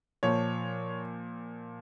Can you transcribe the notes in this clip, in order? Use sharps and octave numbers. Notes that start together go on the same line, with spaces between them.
A#2 F3 C#5